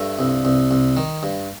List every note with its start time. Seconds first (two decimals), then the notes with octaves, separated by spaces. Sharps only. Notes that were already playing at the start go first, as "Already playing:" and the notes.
Already playing: G2 A3
0.19 C2
0.45 C2
0.71 C2
0.97 D#3
1.23 G2